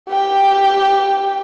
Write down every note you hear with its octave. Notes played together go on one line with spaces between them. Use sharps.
G4 G5